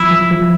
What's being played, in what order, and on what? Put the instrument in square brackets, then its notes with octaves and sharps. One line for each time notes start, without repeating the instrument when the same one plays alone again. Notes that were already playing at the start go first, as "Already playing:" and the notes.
Already playing: [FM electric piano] F3 [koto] E4
[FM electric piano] F3
F3